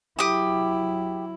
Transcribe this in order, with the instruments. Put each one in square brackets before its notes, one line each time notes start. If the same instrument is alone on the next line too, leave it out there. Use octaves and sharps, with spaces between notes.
[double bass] F#3 E4 [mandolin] G4 D#6